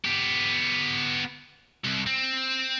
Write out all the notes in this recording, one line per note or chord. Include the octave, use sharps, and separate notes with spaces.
B3 G4
C2
C4